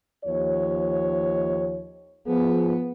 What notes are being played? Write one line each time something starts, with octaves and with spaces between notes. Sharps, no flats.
D#2 F3 C#5
F3 B3 G#4